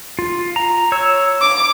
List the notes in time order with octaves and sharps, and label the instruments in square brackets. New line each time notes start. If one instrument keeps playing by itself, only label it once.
[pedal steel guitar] F4
A#5
C#5 E6
[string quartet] D6